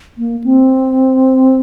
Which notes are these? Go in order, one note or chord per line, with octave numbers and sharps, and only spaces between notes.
A#3
C4